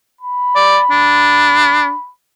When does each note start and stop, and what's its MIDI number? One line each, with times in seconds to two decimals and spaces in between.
0.21 2.10 83
0.56 0.79 74
0.91 1.93 62